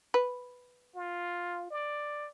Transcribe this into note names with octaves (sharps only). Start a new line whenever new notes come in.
B4
F4
D5